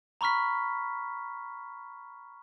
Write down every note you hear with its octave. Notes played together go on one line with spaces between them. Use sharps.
A#5 B5 C#6 F6 B6